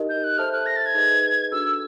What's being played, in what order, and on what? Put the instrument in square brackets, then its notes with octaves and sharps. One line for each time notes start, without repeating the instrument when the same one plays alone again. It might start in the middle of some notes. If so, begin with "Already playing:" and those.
Already playing: [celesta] D#4 G4 A#4 D#5
[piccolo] G6
F#6
[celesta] A4 C5 E5 A5 [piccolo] F6
[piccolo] F#6
A#6
A6
G#6
[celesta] D#4 G#4 B4 D#5
[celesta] D4 F#4 A4 [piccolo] E6